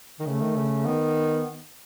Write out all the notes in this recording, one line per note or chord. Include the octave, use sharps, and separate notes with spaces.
D#3
C#3 A3
D#3
C#3
D#3 B3